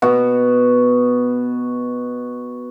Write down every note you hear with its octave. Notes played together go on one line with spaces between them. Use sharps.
B2 F#4